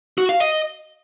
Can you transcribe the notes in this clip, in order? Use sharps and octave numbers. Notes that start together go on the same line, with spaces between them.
F#4
F5
D#5